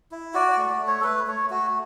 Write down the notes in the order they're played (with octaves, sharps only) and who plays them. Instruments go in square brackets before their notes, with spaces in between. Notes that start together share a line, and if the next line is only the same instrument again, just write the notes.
[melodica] E4
F#4 D5
D5
A3
D5
A3
C#5
A4
A3 B4
A3 C#5
A3 F#4